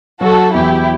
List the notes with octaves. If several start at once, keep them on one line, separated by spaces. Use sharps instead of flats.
F#3 F#4 A4
E2 E4 G4